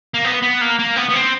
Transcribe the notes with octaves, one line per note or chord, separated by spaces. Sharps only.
A#3
B3
B3
A#3
A#3
B3
B3
C4